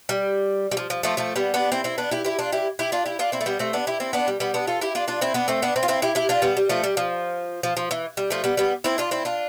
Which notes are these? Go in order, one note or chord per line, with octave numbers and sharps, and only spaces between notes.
G3
G3
F3
F3
F3 A3
F3 A3
G3 B3
B3 D4
C4 E4
C4 E4
B3 D4
E4 G4
E4 G4
D4 F4
E4 G4
E4 G4
D4 F4
E4 G4
D4 F4
C4 E4
A3
G3 B3
A3 C4
B3 D4
E4 G4
C4 E4
B3 D4
G3
G3 B3
B3 D4
F4 A4
E4 G4
D4 F4
D4 F4
C4 E4
B3 D4
A3 C4
B3 D4
C4 E4
F4
C4 E4
E4 G4
E4 G4
D4 F4
G3 B3
G3
F3 A3
G3
F3
F3
F3
E3
G3
F3 A3
G3 B3
G3 B3
C4 E4
D4 F4
C4 E4
D4 F4